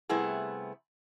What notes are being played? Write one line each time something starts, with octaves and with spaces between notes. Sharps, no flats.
C3 G3 A3 B3 E4 G#4